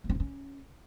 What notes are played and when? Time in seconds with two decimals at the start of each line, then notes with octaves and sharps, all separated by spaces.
0.04 A#3
0.09 C4
0.15 D4
0.20 C#4